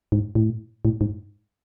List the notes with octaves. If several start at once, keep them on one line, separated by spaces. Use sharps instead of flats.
G#2
A2
A2
G#2